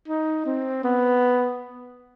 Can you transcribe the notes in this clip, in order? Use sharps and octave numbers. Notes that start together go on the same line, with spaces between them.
D#4
C4
B3